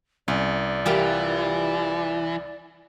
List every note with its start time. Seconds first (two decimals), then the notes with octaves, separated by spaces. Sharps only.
0.28 C2 C#4 D5
0.86 E3 F4 G4 A#4